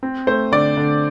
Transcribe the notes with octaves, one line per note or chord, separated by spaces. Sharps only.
C4
A3 C5
D3 D5
D3